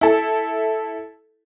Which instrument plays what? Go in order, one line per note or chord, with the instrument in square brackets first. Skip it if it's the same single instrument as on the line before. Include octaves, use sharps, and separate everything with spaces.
[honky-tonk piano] E4 A4